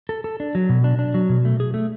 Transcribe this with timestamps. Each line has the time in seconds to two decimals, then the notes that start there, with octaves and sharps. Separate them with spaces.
0.09 A4
0.24 A4
0.40 D4
0.55 F#3
0.69 B2
0.84 D4
0.99 D4
1.14 F#3
1.30 B2
1.45 A3
1.60 G#4
1.74 A3